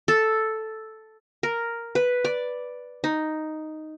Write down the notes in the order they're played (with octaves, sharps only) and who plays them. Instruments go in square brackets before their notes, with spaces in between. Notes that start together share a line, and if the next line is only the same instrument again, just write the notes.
[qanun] A4
A#4
B4
D5
D#4